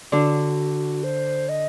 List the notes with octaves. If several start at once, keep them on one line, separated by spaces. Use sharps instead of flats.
D3 D4 F#4
C5
D#5